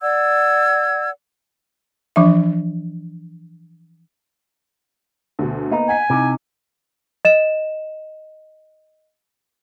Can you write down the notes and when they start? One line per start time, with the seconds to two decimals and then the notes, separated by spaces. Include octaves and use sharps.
0.02 D5 F#5 E6 G#6
2.16 E3 F3 D4 E5
5.39 D2 B2
5.71 A#3 B3 D#4
5.89 F#5 G#5 B6
6.10 C3 D#4 E4
7.25 D#5 E7